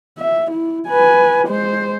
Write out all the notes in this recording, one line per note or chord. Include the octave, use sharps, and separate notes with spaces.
E5
E4
B4 G#5
G#3 C5